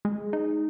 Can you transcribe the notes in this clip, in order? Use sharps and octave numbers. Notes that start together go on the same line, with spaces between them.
G#3
D#4